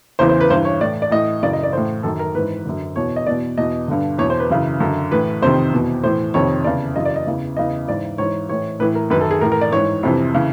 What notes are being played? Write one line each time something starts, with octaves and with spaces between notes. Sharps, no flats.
E2 C#3 E3 C5
C5
B4
G2 E3 C5
C#5
A2 E3 D5
D5
A2 E3 D#5
F#2 C#3 E3 D5
D#5
D5
A2 E3 C5
F#2 D#3 A4
A#4
G#2 E3 B4
F#2 D3
E2 B2 C#5
D#5
E2 B2 D5
E2 B2 D#5
G2 D3
E2 B2 C#5
C5
B4
F#2 C#3 E3
F#2 D3
A2 E3 B4
F2 C3 D#3 C5
E2 B2
A2 E3 C5
F2 C3 D#3 C#5
E2 C#3 E3 D5
F#2 C#3 E3 D#5
D5
D#5
E2 C#3 E3
E2 C#3 E3 D#5
G#2 E3 D5
G#2 E3 C#5
A2 E3 C#5
A2 E3 B4
A#4
F#2 D#3 B4
A4
G#4
A2 E3 A#4
A#4
D5
G#2 E3 C#5
F2 C3 E3
C#3 E3